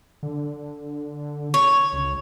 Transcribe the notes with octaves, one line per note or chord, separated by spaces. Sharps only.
D3
C#5
C#2